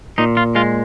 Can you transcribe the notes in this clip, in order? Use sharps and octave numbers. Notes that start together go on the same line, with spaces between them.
A#2 D#4
F4
G#3 F4